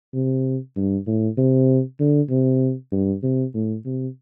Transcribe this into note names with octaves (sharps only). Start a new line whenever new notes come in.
C3
G2
A2
C3
D3
C3
G2
C3
A2
C3